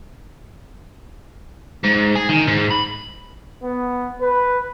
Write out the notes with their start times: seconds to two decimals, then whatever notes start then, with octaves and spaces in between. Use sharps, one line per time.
1.84 G#2
2.15 G#4
2.29 D#3
2.47 G#2
2.71 B5
3.63 B3
4.21 B4